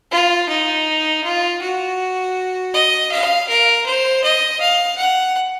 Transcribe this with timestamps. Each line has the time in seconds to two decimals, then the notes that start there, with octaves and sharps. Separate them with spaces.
0.11 F4
0.49 D#4
1.24 F4
1.61 F#4
2.74 D#5
3.11 F5
3.48 A#4
3.86 C5
4.23 D#5
4.60 F5
4.97 F#5